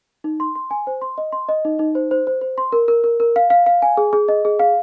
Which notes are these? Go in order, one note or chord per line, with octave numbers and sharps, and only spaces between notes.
D#4
C6
C6
G#5
C5
C6
D#5
C6
D#5
D#4
D#4
C5
C5
C5
C5
C6
A#4
A#4
A#4
A#4
F5
F5
F5
G#5
G#4
G#4
D#5
G#4
F5